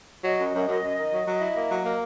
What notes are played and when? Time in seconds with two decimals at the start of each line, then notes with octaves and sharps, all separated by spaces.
0.24 F#3 D#5
0.39 F#2
0.54 F#2
0.68 F#2
0.83 F#2
0.98 D#3
1.13 F#3
1.27 F#3
1.41 E4
1.56 A#3
1.70 F#3
1.86 A#3